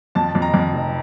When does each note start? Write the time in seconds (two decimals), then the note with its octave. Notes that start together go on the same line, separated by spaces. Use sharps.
0.15 F2 A5
0.28 A5
0.35 F2
0.42 A#5
0.54 F2
0.73 F1